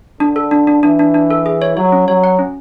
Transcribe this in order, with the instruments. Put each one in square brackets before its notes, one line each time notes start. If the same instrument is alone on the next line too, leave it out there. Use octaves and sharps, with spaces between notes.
[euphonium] D3 [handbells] D4
[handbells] A4
D4
D4
[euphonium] E3 [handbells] D4
[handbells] D4
D4
A4
G#4
C#5
[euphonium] F#3 [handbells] C#5
[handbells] C#4
[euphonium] F#3 [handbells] C#5
[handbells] F#5
C#4